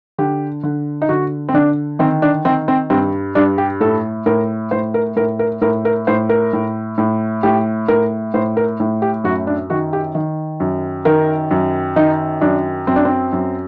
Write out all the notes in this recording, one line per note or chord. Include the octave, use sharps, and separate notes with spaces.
D3 G4
D3
D#4
D3 F#4
C4
D3 D4
D#3 C4
D4
D#3 C4
C4
G2 C4
G2 D4
G4
A2 A4
A2 A#4
A2 C5
A#4
A2 A#4
A#4
A2 A#4
A#4
A2 C5
A#4
A2
A2
A2 G4
A2 A#4
A2 C5
A#4
A2
G4
F#2 F#4
D4
D#3 F#4
G4
D#3
F#2
D#3 A#4
F#2
D#3 D#4
F#2 D4
F#2 C4
D4
C4
F#2